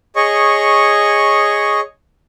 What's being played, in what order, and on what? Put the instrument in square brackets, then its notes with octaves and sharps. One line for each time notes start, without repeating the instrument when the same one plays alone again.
[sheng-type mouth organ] G#4 C#5 D#5 C#6